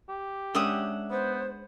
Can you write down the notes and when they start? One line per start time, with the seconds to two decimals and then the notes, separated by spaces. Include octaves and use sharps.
0.09 G4
0.55 G#3 C#4 D4 E5 F#5 D#6
1.11 B3 C5